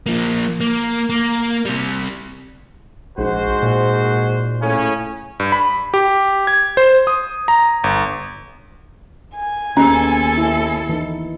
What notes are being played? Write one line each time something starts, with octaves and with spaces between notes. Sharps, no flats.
F3 A#3
A#3
A#3
C3 G3
A#1 G#2 F#4 C5
A#2
A2 C#3 C#4
G2
B5
G4
G#6
C5
D#6
A#5
G1
G#5
D#2 D#3 B3 C#4 G#4 A4
E4
E3 D#4